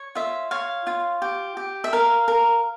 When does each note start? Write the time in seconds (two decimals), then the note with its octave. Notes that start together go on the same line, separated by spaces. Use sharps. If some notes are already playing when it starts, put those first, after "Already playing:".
Already playing: C#5
0.15 F4 E5
0.51 C#5 F5
0.87 F4
1.22 G4
1.57 G4
1.84 E5
1.93 A#4 F5
2.28 A#4